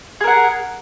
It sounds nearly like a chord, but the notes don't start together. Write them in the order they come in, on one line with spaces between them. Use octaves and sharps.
G#4 A#4 F#5